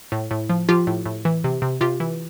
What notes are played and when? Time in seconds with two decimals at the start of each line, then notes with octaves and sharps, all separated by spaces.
0.12 A2
0.31 A2
0.50 F3
0.69 F3 F4 G4
0.87 A2
1.06 A2
1.25 E3
1.44 C3
1.62 C3
1.81 C3 F4 G4
2.00 E3